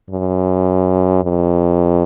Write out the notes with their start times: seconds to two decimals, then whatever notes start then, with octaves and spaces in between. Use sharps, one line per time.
0.10 F#2
1.23 F2